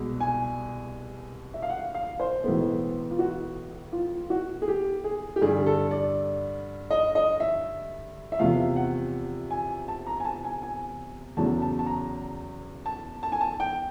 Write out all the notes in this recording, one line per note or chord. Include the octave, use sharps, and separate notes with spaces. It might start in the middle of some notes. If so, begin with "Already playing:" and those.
Already playing: C2 B2 G#3
G#5
E5
F5
F#5
F5
C5
B1 A2 E3 G#3 B3
F4
F#4
F4
F#4
G#4
G4
G#4
G4
G2 D3 G3 G#4
A4
D5
D#5
D#5
E5
E5
E2 C3 F3 A3 F5
F#5
G#5
A5
A#5
G#5
A5
G#5
G#5
E2 C#3 F#3 A3 A5
A5
A5
A#5
A5
A5
G#5
A5
G5